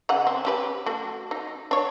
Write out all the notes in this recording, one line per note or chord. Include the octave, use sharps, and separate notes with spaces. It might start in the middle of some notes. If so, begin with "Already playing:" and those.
C#3 D#4 F#5
C4
C#4 G4 B4
A3 F#4
D#4
D4 C#5